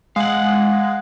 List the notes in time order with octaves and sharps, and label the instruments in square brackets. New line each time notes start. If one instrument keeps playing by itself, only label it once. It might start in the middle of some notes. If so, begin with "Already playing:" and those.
[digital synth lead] G#3 [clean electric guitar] F5 F#5